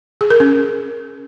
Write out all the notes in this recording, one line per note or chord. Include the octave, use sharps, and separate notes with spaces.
G#4
A#4
C#4